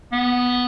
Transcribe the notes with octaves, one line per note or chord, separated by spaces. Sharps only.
B3